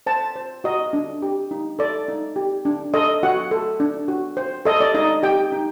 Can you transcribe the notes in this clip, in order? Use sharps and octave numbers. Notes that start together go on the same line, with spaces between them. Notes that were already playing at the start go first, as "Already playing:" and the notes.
C5 A5
C5
F#4 D#5
D4
G4
D#4
A4 D5
D#4
G4
D4
A4 D#5
F#4 F#5
A4
D4
F#4
C5
A4 D#5
D5
D#4 D#5
G4 G5
D#4